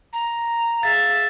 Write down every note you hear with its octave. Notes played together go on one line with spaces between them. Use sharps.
A#5
G#4 E5 F5 A6